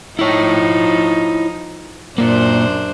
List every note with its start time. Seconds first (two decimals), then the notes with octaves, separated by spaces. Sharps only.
0.19 F3 D#4 E4 C#5
2.18 F#2 A#2 A#3 D4 C5